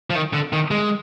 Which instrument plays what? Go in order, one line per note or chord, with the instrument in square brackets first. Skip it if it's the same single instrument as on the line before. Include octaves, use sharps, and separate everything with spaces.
[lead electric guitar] F3
D#3
D3
D#3
G#3